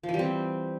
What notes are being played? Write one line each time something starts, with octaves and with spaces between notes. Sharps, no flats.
F3
E3
G3
C4